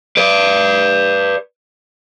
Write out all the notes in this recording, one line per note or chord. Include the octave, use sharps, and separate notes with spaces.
B4 D5